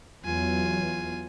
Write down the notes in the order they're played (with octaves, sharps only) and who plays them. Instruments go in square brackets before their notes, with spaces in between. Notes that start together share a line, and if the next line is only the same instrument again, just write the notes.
[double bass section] E2 F#3 [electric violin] F4 G#5